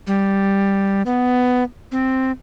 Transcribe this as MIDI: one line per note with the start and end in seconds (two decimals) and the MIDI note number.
0.07 1.02 55
1.06 1.63 59
1.92 2.32 60